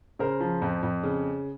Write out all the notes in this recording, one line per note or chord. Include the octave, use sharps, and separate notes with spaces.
C#3 A#4 C5
F3
F2
F2
C#3